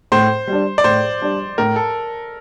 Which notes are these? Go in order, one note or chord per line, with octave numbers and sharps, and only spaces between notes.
A2 C5
G3 D4
D5
A2 C5
G3 D4
A2 A#4
A4